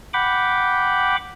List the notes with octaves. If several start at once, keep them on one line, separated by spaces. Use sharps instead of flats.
F#5 G5 B5 D6